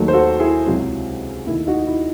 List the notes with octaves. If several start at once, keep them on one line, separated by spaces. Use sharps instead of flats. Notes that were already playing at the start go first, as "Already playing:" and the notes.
Already playing: D#2 D#3 F#3 A3
C5
F#4 A4
E4 G#4
C#2 C3 F#3
D#2 D#3 A3 E4
D#4 F#4
E4